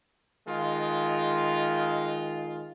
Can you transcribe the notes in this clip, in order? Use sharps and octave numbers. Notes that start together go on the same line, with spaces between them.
D#3 G#3 F4